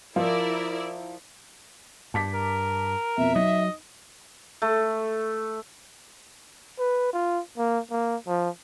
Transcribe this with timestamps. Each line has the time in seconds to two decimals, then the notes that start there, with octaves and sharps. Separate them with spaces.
0.16 F3 E4 A#4 D5
2.14 G2 A5 D6 B6
2.34 A#4
3.17 F2 B2 E5
3.36 F#3 D#4 D#5
4.62 A3
6.79 B4
7.13 F4
7.57 A#3
7.91 A#3
8.27 F3